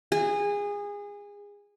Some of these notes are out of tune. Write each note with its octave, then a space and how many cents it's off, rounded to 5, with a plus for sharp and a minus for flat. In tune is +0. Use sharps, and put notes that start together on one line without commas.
G#4 -25